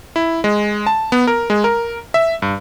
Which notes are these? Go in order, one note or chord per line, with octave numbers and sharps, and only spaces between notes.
E4
G#3
A5
B3
A#4
G#3
A#4
E5
G2